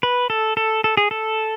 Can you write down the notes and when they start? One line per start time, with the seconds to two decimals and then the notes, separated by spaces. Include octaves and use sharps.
0.03 B4
0.30 A4
0.57 A4
0.84 A4
0.97 G#4
1.11 A4